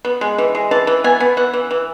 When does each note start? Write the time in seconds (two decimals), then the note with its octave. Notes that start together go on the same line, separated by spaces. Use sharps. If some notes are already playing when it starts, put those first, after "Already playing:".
0.05 B3
0.21 G#3
0.38 E3
0.55 G#3
0.71 E3 A5
0.87 E3
1.04 B3 G#5
1.20 B3
1.37 E3 F#5
1.53 E3
1.71 E3